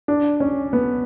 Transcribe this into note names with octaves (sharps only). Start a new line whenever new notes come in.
D4
C#4
B3